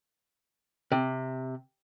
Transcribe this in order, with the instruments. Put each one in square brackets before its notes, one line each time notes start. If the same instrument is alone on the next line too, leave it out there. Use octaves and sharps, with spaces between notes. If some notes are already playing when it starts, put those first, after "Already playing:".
[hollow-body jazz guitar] C3